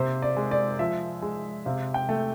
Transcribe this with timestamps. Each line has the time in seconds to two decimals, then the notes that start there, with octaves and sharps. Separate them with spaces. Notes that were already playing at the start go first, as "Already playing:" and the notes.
Already playing: C3 A#3 C5
0.22 D5
0.37 G#3
0.51 D5
0.79 F3 E5
1.22 G#3
1.65 C3 F5
1.94 G5
2.09 A3